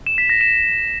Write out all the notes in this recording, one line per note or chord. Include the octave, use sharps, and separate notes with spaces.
E7
B6
A#6
E7